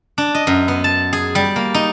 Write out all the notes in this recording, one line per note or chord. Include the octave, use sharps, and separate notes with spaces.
D4
D#5
F#2
B3
A5
G#4
G3
A#3
D#4